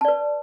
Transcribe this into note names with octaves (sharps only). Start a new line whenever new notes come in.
B4 D5 A5